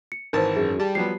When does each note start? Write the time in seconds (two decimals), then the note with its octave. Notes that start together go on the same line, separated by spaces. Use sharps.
0.12 C#7
0.33 G#1 E3 A#4 C5 A5
0.56 F#2 G#4
0.80 G3 A5
0.95 F3 F#3 B3 C7